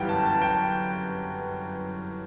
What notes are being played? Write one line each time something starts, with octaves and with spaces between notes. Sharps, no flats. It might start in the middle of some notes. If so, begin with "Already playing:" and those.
Already playing: G1 F#2 E3 G3 F#5 G5
A5
A5
G5